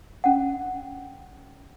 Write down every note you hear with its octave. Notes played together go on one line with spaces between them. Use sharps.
C#4 F#5